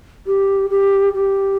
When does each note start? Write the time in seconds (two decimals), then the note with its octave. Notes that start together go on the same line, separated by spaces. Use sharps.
0.27 G4
0.70 G4
1.14 G4